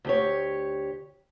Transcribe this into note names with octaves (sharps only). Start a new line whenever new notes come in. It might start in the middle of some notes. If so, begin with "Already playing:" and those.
D2 G4 C#5